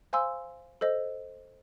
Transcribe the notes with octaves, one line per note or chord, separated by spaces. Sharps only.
C5 F5 G#5 C6 E6
A4 C5 D#5